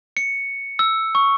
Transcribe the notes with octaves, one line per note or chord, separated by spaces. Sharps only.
C#7
E6
C#6